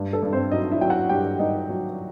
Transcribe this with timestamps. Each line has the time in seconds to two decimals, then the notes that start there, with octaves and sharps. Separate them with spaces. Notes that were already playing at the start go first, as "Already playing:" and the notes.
Already playing: G2
0.13 A4
0.23 G2
0.32 C4 C5
0.52 F#3 D#4 D#5
0.72 E4 E5
0.81 F#3 G5
0.90 F#4 F#5
1.09 G2 G4 G5
1.39 G2 D#4 D#5
1.69 F#3